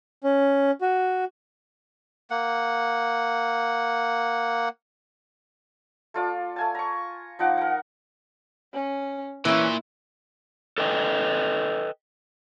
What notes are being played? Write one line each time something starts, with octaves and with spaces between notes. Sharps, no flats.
C#4
F#4
A#3 F#5
A3 F4 D5
A3 G#5 A5
A#5 C#6
F3 D#4 F#5 D6
A#4 F#5
C#4
A#2 E3 C#4 E4
A4 B4 D#5 G5 G#5